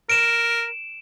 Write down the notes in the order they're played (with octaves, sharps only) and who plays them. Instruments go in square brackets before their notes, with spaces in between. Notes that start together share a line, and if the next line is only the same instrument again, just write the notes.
[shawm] A#4 [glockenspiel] D7 E7